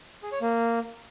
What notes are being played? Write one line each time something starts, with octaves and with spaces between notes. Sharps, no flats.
G#4
C#5
A#3